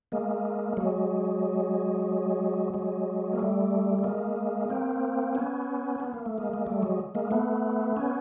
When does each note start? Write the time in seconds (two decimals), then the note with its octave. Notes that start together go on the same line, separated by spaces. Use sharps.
0.12 G#3 A#3
0.77 F#3 G#3
2.74 F#3 G#3
3.33 A#3
3.39 G3 A3
3.99 A3
4.04 G#3 A#3
4.69 A#3 C4
5.35 B3 C#4
6.00 B3
6.14 A#3
6.26 A3
6.38 G#3 A#3
6.54 G#3
6.67 G3 A3
6.82 F#3 G#3
7.15 G#3 A#3
7.31 A3 B3
7.97 B3 C#4